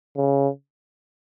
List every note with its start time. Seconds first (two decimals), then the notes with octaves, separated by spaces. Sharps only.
0.17 C#3